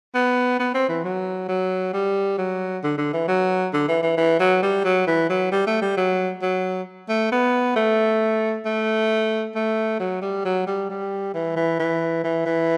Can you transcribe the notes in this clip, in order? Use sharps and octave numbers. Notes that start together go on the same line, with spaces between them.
B3
B3
C4
E3
F#3
F#3
G3
F#3
D3
D3
E3
F#3
D3
E3
E3
E3
F#3
G3
F#3
E3
F#3
G3
A3
G3
F#3
F#3
A3
B3
A3
A3
A3
F#3
G3
F#3
G3
G3
E3
E3
E3
E3
E3